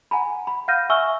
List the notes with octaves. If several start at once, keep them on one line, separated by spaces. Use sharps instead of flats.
F#5 G#5 A#5 B5
B5
F5 F#5 F6 G6 A#6 D#7
E5 G#5 C#6 E6 F6 G7